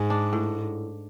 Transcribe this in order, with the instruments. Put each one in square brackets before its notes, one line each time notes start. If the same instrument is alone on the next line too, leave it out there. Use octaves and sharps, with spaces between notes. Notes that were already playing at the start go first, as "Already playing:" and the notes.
Already playing: [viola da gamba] G#2 [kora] G#4
[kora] D4
A2